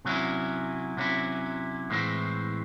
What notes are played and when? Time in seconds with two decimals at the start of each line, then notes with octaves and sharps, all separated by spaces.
0.05 C3 F#3 C#4 E4
0.97 C3 F#3 C#4 E4
1.90 A2 E3 G#3 C4